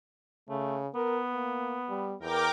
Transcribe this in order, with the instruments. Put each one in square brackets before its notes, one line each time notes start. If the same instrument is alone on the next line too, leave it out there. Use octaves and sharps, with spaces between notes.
[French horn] C#3 [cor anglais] A3
[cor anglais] B3 [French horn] A#4
[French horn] A#3
G3
[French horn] E2 [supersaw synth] A#4 G5 D6